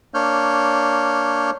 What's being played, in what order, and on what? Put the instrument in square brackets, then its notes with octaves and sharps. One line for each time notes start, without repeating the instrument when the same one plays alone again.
[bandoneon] A#3 D4 C#5 F6 G6